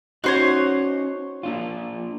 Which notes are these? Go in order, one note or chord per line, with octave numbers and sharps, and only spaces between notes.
C#4 D#4 F#4 C5 C#5 D#5
A#3 D4 F4